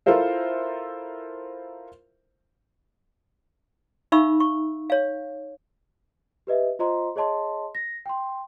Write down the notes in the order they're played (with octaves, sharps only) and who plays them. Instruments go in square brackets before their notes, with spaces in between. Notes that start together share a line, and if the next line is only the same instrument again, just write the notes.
[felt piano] E4 F4 A4 A#4 C5 E5
[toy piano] D#4 E5 F5 B5 C#6 E6
C#6
C#5 F5
[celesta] G4 B4 D#5 E5
F4 C5 D#5 A#5 C6
G#4 C#5 D#5 A5 C6
A#6
G5 C6